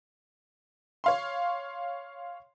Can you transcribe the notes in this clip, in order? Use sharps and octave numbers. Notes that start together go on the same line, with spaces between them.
C#5 F5 C6